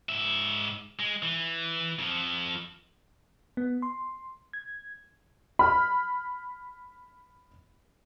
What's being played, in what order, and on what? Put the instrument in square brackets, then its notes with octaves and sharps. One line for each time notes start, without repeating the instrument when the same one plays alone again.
[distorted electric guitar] G#2 E5
G#3
E3
F2 F3
[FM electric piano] B3
C6
G#6
[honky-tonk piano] B5 F6